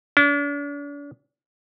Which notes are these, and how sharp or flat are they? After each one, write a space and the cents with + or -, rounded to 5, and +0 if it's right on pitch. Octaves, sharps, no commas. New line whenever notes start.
D4 -40